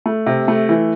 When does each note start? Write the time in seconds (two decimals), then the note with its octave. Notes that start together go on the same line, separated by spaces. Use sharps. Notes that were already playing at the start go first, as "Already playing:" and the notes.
0.06 A3
0.26 C3
0.48 A3
0.69 E3